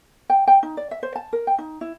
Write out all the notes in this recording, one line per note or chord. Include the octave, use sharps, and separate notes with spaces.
G5
G5
D#4
D5
E5
C5
A5
A#4
G5
D#4
E4